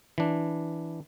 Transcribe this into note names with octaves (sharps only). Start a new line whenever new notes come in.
E3 D4